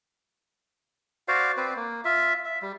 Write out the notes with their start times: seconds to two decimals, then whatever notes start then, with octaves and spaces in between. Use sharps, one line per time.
1.28 F#4 C5 D5 F5
1.57 C4 B4 C5 D5
1.76 A#3
2.05 F4 E5
2.45 E5
2.62 G3